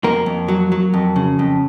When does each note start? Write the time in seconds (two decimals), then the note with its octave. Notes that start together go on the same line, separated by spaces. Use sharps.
0.04 F2 A#3 A#4
0.26 F2
0.48 F#3
0.72 F#3
0.94 F2
1.16 C#3
1.39 F2